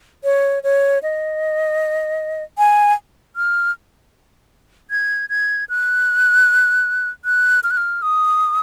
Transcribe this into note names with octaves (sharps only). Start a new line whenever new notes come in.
C#5
C#5
D#5
G#5
F6
G#6
G#6
F#6
F#6
F6
F#6
F6
D#6